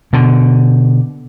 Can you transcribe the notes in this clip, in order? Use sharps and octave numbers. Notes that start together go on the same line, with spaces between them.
B2 D3